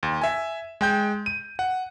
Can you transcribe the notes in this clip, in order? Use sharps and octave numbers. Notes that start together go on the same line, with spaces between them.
D#2
E5 G#5
G#3 G5 G6
D#7
F#5